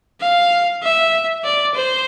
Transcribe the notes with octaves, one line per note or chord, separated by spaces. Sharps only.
F5
E5
D5
C5